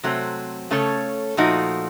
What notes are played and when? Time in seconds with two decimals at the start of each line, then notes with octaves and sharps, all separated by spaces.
0.03 C3 F#3 A3 C4
0.71 C#3 A3 C#4 A4 C#5
1.37 A#2 F3 A3 D#4 F#4